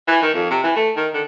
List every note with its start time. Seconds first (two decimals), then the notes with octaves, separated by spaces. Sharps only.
0.08 E3
0.22 D#3
0.34 F2
0.51 C3
0.63 E3
0.76 A3
0.96 D#3
1.14 D3